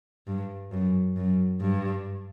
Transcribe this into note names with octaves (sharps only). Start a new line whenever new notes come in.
G2
F#2
F#2
G2